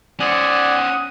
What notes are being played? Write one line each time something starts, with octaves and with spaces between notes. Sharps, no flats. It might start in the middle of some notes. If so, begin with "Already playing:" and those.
C#4 C5 D5 F#5 G#5 D#6